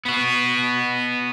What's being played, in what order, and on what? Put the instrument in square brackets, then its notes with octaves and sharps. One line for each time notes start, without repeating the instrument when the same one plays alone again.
[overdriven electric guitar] B3 F#4